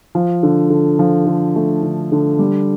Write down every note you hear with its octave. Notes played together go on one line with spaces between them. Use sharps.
F3
D3
D3
F3
D3
A3
D3
D3
G3